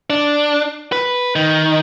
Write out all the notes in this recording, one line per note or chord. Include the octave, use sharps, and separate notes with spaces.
D4
B4
D#3